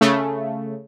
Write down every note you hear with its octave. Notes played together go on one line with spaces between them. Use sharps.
C#3 A3